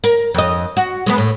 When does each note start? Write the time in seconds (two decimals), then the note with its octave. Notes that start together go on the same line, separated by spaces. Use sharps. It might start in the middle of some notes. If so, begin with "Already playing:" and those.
0.04 A#4
0.34 F2 D#5
0.77 F#4
1.06 G#3 A#3 B3
1.18 A2